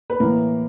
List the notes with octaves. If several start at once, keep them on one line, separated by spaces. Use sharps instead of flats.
B4
A2 E3 A#3 A#4